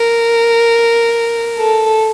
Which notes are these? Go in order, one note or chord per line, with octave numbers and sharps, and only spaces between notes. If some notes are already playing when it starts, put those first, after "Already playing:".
Already playing: A#4
A4